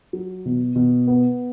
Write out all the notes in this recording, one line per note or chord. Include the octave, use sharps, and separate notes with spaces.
F#3
B2
B2
B3